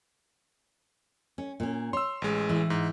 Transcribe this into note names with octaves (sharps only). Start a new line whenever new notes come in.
C#4
A#2 C#4
C#5 C6 E6
A1 G#3
E3
G#2